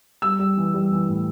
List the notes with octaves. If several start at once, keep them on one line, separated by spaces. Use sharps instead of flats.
G3 E6
G3
E3
G3
E3
A2